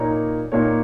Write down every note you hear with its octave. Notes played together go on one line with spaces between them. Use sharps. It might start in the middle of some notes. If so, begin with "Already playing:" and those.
Already playing: A#2 A#3 D#4 A#4 C#5
A#2 A#3 D#4 A#4 C#5